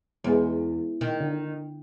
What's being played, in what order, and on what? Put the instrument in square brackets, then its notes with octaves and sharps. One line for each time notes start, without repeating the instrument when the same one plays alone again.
[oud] E2 [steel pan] G#3 B3 G#4
[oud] D#3
[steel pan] D3